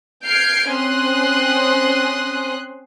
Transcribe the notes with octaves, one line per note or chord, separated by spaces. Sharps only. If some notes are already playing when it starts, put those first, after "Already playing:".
F6 G6 G#6 C7 D7
C4 C#4 C6 D#6 F#6